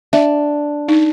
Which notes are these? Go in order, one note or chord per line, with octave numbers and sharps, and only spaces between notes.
D4 E5
D#4